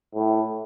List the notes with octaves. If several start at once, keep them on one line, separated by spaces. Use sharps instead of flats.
A2